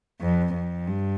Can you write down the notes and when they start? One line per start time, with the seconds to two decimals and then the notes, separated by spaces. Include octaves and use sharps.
0.21 F2
0.54 F2
0.87 G2